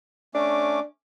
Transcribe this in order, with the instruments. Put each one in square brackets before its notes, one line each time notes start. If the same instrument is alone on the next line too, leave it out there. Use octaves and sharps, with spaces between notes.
[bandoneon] A3 C#4 D6 [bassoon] D4